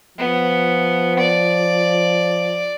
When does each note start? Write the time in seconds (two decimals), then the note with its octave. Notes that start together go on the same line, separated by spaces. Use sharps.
0.18 F3 B3
1.19 D5